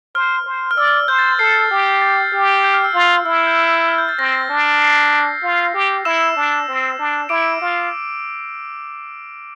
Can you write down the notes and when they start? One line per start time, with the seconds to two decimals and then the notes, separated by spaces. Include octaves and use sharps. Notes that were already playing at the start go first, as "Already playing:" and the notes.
0.15 C5 F6
0.46 C5
0.71 F6
0.77 D5 E6
0.88 F6
1.08 C5 G6
1.18 A6
1.39 A4 C7
1.71 G4
2.02 A6
2.32 G4
2.64 G6
2.74 F6
2.84 E6
2.94 F4
3.25 E4 E6
3.36 E6
3.47 G6
3.88 F6
3.98 G6
4.09 A6
4.19 C4 A#6
4.49 D4
4.82 C7
5.43 F4
5.74 G4
6.05 E4 E6 E7
6.37 D4
6.68 C4
6.99 D4
7.29 E4 D6 D7
7.61 F4